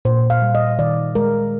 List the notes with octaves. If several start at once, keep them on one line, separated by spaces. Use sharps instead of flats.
A#2 C5
F5
G3
D#5
D#3 D5
G#3 A#4